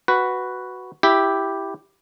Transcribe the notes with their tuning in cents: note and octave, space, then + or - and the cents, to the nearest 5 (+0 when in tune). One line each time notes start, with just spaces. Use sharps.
F#4 +0 B4 +0
E4 +0 G4 +0 E5 +0